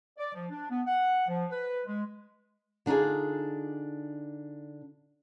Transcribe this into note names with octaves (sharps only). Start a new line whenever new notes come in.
D5
F3
D4
B3
F#5
F3
B4
G#3
D3 D4 D#4 F4 G#4